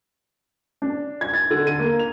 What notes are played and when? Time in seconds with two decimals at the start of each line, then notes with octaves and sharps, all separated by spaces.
0.82 D4
1.21 G#6
1.34 A6
1.51 D3
1.67 D#7
1.79 A#3
1.99 F7